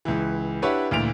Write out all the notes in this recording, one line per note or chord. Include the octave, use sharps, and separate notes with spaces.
C#2 E3
D4 E4 G4 B4 C#5 F#5
D2 A#2 E3 D7 F7